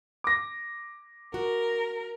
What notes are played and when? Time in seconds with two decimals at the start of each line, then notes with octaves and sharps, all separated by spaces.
0.24 D6 A#6
1.34 F#4 A#4